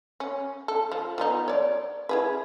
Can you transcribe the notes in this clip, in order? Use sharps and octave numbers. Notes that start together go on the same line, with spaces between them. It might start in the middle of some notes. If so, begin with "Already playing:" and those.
C#4
A4
F3
F3 B3 D#4
C#5 D5
E4 G#4 B4